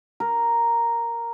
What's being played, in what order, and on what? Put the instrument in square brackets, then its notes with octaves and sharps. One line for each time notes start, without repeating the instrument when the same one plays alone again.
[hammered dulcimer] A#4